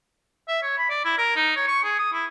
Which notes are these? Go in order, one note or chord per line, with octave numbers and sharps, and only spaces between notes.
E5
C#5
B5
D5
E4
A#4
D#4
C#5
C#6
G#4
D#6
E4